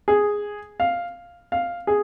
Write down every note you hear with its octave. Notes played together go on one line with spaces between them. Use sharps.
G#4
F5
F5
G#4